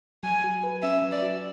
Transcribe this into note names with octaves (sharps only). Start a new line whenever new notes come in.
F#3 G#5
F#4
B4
C#4 E5
F#3
D5
F#4